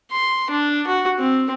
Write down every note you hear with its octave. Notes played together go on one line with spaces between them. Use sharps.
C6
D4
F#4
C4